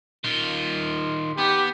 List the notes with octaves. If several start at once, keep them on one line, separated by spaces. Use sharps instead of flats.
D#3 F4
B3 G4